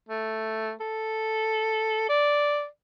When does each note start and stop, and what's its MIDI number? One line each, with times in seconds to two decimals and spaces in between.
0.09 0.73 57
0.80 2.08 69
2.09 2.66 74